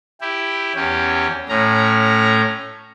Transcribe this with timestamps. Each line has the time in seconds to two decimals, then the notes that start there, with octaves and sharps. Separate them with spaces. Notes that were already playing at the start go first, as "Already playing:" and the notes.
0.21 E4 G4
0.75 E2 C#4 G4
1.49 A2 C#4 A#5